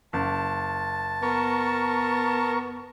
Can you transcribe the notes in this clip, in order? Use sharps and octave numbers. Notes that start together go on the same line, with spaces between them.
F#1 A5
B3 A#4 C#6